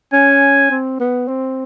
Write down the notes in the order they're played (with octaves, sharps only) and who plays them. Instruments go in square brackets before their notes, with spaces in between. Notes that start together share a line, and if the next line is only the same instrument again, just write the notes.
[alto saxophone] C#4 [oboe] G#5
[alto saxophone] C4
B3
C4